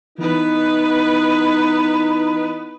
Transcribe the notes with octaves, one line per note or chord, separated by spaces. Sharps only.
E3 B3 D#4 B4